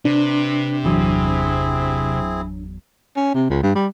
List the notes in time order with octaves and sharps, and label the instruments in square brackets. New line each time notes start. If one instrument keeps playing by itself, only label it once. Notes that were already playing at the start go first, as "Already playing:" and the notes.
[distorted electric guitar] C3 [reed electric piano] D4 [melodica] B4
[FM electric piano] G1 E2 F#3 [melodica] C4 E4 G#4
[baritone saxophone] C#4
C3
C#2
G2
G3